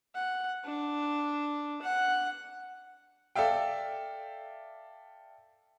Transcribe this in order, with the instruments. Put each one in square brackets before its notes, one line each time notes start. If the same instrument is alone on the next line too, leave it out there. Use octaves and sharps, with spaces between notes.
[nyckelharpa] F#5
D4
F#5
[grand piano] A4 D5 E5 F5 G5